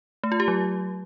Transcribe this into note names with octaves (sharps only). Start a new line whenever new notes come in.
A3
F4
G4
F#3